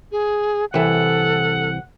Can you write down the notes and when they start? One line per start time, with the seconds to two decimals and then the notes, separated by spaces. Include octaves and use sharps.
0.12 G#4
0.74 C2 E3 A4 F#5